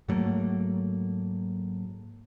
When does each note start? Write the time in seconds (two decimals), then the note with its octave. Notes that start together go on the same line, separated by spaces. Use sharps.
0.09 G#2 F#3 A3 A#3